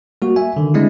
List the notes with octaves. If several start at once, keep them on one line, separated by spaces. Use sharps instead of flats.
G3 A#3 F#4
E5 G#5
D3 D#3
G3 G#3 C4 D4 E4